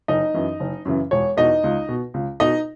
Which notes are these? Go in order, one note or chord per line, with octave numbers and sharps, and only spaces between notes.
F#1 D#4 D#5
F#2 E3
F#1
F#2 C#3 E3
E1 C#5
E2 B2 D#4 D#5
C#2
B2
C#2
B2 D#4 D#5